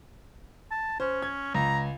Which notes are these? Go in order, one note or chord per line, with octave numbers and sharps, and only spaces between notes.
A5
C#4 C5
G#6
C#2 A#5